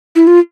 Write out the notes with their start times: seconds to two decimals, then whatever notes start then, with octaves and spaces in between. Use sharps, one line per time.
0.16 E4
0.27 F4